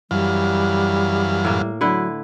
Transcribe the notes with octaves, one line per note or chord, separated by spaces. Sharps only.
F#2 E3 G3 F5
A2 A#3
D3 F#3 E4 B4